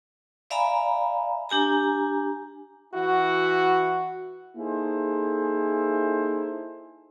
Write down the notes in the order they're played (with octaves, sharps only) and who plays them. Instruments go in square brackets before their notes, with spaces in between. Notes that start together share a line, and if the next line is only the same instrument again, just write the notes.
[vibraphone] D5 E5 F5 G#5 A#5 B5
D4 G4 G#5 A#5
[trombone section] E3 E4 F#4
[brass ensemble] A#3 D#4 E4 G#4 A4 C5